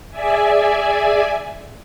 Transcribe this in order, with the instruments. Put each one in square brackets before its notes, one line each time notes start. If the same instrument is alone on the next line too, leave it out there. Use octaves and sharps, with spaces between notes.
[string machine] G#4 D5 E5 G#5